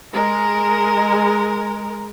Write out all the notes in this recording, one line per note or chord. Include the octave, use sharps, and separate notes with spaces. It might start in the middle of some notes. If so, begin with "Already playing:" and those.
G#3 A#4